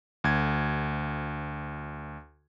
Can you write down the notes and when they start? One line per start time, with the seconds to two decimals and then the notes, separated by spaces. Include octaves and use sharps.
0.24 D2 G#6